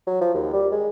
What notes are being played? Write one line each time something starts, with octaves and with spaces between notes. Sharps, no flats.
F#3
F3
D#2
G3
G#3